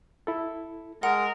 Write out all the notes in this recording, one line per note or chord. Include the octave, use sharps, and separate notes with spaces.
E4 A4
G#3 A#4 F#5